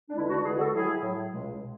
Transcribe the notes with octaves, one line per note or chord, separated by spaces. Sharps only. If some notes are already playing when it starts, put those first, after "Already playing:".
D4
E2 D3 G#3 E4
D4 F#4
E2 D3 G#3 E4 G#4
F#4 A4
A2 F#3 E4 G#4
A2 F#3
C#2 B2 G#3
B2